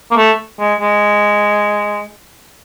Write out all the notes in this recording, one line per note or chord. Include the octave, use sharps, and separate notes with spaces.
A#3
A3
G#3
G#3